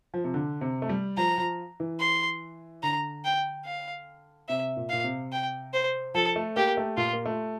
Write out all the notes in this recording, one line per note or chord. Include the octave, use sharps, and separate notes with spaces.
F3
C3
D3
C3
A3
G3
F3 A#5
F3
E3
C6
D3 A#5
G5
F5
C3 E5
A#2
A#2 F5
C3
G5
C5
F3 A4
A3
A#3 G4
A3
A#2 F4
A#3
A3